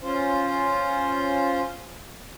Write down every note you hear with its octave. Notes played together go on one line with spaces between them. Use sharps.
C#4 F4 C5